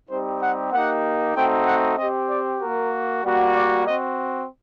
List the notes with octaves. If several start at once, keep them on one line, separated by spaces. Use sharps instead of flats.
G3 C4 D#4 G4 C5
F#5
A#3 D#4 G4 F#5
A3 C4 D#4 F#4 G5
F#5
C4 G4 D#5
D5
A#3 F#4 A#4
G3 A#3 F#4
D5
C4 F#4 D#5